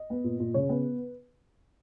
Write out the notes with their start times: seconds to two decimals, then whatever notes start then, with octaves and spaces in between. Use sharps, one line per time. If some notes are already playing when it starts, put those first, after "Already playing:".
Already playing: D#5
0.10 B3
0.24 A#2
0.40 A#2
0.54 C#3 C#5
0.69 B3 B4